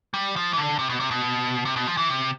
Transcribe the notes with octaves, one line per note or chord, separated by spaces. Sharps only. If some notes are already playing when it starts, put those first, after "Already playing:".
G3
F3
E3
D3
C3
B2
C3
B2
C3
B2
F3
E3
C3